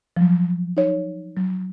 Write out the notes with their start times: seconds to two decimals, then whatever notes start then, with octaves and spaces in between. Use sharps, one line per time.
0.17 F3 F#3
0.77 D#4 C#5
1.37 F#3